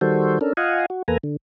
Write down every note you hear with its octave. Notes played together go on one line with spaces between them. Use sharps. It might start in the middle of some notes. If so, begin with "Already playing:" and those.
D#3 G3 F#4 A4 C5
C#4 D4 A4 A#4
F4 D#5 F5 F#5 G#5
F#4
E2 A#3 A4 B4 G#5 A#5
D3